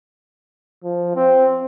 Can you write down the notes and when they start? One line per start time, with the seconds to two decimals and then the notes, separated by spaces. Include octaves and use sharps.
0.84 F3
1.15 C4